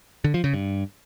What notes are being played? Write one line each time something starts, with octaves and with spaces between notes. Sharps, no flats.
D3
F3
C#3
G2